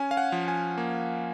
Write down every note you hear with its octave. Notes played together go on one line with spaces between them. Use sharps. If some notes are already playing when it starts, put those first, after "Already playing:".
Already playing: C#4 G#5
F5
F#5
F3
G#5
A#3